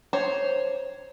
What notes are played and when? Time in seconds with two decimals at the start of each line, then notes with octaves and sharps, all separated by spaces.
0.13 C5 C#5